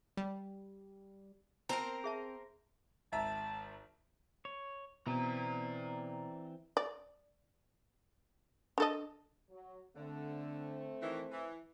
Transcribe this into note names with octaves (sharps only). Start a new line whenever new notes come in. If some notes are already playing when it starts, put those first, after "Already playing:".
G3
C4 A#4 C5 A5 A#5
G#4 E5 A5
G#1 E5 A5 A#5
C#5
B2 E3 C4 D5 A#5
D5
D4 A4 D#5
F#3
D3 A3 C4
D#3 E3
E3